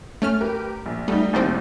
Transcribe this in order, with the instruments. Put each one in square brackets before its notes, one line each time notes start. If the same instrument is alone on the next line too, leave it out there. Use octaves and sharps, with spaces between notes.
[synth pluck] A3 C#4 F6
[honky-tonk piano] G4 A#4 B4
A#1
[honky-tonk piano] G3 D#4 [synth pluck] A3 B3
[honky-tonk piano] A1 D#2 A2 [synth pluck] D#3 G3 C4